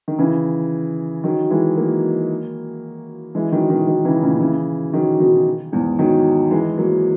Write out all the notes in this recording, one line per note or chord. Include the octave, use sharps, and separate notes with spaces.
D#3
C#3 E3
D#3 F#3
E3 G#3
F#3 A#3
E3 G#3
D#3 F#3
B2 D#3
B2 D#3
C#3 E3
A#2 C#3
C#3 E3
D#3 F#3
B2 D#3
E2 G#2
D#3 F#3
E3 G#3
F#3 A#3